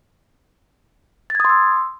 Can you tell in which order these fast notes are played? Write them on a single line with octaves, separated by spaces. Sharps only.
A6 G#6 D#6 C6 E6